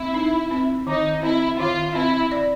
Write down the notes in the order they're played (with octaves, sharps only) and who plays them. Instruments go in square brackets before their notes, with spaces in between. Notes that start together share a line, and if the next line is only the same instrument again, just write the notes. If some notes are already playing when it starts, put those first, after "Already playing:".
Already playing: [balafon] C4 [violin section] E4
[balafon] D#4
C4
[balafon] D#3 [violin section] D#4
[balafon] C4 [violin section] E4
[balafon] D#3 [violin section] F4
[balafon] C4 [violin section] E4
[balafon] D5